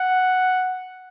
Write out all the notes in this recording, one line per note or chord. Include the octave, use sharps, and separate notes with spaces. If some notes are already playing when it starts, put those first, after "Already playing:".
Already playing: F#5